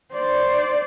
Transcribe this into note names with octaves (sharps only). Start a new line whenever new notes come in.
C5 D5